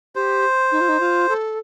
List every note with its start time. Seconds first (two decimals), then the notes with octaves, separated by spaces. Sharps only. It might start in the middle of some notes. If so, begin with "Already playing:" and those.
0.15 G4 C5
0.71 D#4
0.81 F4
0.89 D#4
1.00 F4
1.29 A4